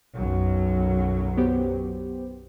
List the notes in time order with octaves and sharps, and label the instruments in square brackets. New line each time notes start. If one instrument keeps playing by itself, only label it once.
[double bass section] B1 F#2 F#3
[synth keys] B3 G4 C5